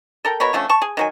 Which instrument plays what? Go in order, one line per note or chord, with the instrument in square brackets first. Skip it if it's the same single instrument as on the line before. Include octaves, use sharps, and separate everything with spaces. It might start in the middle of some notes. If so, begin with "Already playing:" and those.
[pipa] A4 A#4 G5
B2 A#4 C#5 B5
D3 F3 A3 C#4
A5 C#6
G#4
D#3 F#3 G#5